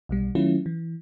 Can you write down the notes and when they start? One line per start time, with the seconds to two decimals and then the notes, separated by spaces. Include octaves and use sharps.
0.09 B1 B2 G3
0.35 D#3 F#3 A3 C#4 E4 F4
0.66 E3